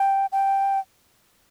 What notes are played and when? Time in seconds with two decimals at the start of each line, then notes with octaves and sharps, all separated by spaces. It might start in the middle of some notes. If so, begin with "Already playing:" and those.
Already playing: G5
0.32 G5